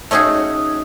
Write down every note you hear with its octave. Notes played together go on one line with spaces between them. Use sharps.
A3 C#4 D#4 F#4 G#4